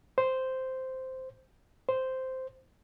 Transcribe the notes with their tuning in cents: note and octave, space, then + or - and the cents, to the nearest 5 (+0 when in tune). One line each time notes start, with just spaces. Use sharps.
C5 -5
C5 -5